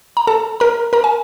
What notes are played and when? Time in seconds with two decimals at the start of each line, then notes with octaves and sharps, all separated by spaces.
0.17 A#5
0.27 A4 A5
0.60 A#4 A#5
0.93 A#4 A#5
1.04 G#5